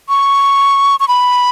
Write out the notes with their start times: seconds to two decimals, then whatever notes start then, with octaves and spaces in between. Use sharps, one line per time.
0.09 C#6
1.00 C#6
1.08 B5